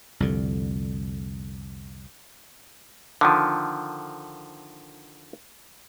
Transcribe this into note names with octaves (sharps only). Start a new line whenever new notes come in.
C2 F2 D3
D3 D#3 F3